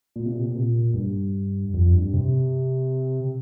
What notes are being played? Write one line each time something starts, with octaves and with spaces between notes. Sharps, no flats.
A#2
C3
A#2
C3
A#2
G2
F2
G2
C3